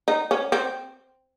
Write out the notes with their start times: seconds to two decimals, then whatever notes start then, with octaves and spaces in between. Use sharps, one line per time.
0.08 D#4
0.31 C#4
0.52 C4